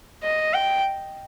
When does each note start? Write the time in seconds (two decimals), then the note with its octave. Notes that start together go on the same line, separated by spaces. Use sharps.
0.24 D#5
0.54 G5